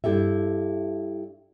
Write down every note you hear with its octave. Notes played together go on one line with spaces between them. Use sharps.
G2 E4 G4 A4 E5